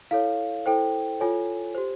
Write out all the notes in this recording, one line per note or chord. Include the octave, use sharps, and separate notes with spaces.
E4 A4 C#5 F5
E4 A4 C5 G5
F4 A4 C#5 G#5
G4 C5